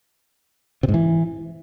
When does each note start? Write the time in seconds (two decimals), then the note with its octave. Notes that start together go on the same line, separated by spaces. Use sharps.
0.83 C3
0.89 G#2
0.94 E3